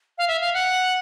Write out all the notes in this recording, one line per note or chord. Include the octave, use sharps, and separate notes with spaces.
F5
E5
F5
F#5